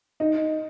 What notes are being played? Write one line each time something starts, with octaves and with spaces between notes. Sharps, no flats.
D#4